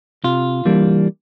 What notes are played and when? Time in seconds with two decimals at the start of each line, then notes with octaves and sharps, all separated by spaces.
0.24 C3 F4
0.65 E3 G3 A#3 D4